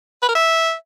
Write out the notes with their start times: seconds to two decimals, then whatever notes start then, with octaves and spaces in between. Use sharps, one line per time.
0.22 B4
0.28 A#4
0.35 E5